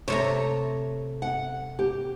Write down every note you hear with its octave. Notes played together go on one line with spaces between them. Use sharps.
C3 A3 C#5 A#5
F#5
G4